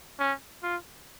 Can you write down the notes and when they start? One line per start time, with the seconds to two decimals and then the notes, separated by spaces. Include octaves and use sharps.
0.19 C#4
0.63 F4